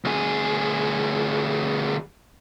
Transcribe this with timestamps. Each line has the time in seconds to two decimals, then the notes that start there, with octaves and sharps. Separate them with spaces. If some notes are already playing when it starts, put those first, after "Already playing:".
0.04 D2 G#4